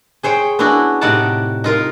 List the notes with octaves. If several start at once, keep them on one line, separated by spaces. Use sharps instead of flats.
G#4 C5 C#5 G5
B3 C#4 D4 E4 F#4
A2 C3 D#4 D5 F#5 A5
D#4 F4 A#4